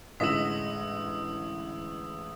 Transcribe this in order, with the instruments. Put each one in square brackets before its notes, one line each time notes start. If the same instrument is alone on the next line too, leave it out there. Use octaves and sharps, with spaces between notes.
[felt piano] A1 G#3 E7 [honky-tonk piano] D3 D#5 B6 [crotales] D#6 E6